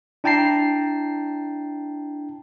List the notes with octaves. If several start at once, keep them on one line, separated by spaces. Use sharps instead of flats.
D4 E4 G5 A5 A#5 C7